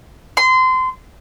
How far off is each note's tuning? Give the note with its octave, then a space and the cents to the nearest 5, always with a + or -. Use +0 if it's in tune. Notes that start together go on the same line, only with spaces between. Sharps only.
C6 -25